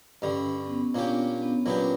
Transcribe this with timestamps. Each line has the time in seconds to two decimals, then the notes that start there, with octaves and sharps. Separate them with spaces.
0.22 G2 D3 G3 C#4
0.58 C#4
0.66 B3
0.75 C#4
0.94 A#2 A#3 C#4 D4 G4
1.42 B3
1.66 A#2 F#3 B3 C#4 D4 G4